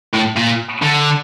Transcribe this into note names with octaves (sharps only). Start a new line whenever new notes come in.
A2
A#2
D3